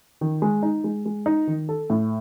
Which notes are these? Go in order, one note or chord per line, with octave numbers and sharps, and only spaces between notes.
D#3
G#3
D#4
G#3
G#3
D#4
D#3
A4
A2